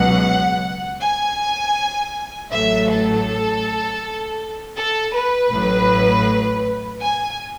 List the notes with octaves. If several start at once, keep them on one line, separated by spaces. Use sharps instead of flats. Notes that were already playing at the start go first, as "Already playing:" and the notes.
Already playing: C#2 B2 F#3 F#5
G#5
A1 A2 F#3 A3 E5
A4
A4
B4
A1 A2 F#3
G#5